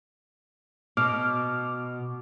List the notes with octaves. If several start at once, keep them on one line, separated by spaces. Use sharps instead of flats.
B2 D6 F6